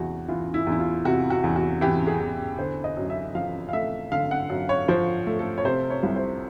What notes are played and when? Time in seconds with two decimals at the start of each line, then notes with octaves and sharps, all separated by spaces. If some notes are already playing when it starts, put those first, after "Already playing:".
Already playing: E2 C3 F#4
0.28 E3 F4
0.54 E4
0.67 E2
0.72 E4
0.79 F4
1.05 C3 F#4
1.30 F#4
1.44 E2
1.56 F#4
1.81 E3 G4
2.07 G#4
2.20 E2
2.58 D3 C5
2.84 D#5
2.97 F#2
3.10 E5
3.35 F3 F5
3.69 F5
3.73 A3 E5
4.12 D3 F5
4.31 F#5
4.50 F#2
4.69 C#5
4.88 F3 C5
5.27 A3
5.39 A4
5.58 C#5
5.65 C3 C5
5.90 C#5
6.03 C2
6.16 C5